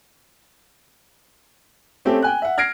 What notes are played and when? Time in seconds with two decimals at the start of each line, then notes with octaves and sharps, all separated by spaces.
2.05 A3 C4 C#4 G4 A4
2.22 G5 G#5 F#6
2.42 E5 F#5
2.58 F6 G#6 A#6 C7 D7